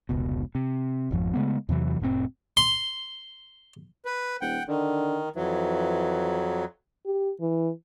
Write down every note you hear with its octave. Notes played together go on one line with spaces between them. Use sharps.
F1 C#2 B2
C3
G#1 F2 F3
C#3 G#3 A3 B3
E2 C3 E3 F#3
F1 A2 C3 C4
C6
B4
D#1 F#5 G5
D3 D#3
F2 E3 F#3
G4
E3